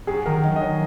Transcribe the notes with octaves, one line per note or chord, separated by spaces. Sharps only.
F#2 G#4
D#3 A#4
F#3 D#5
D#5
C#5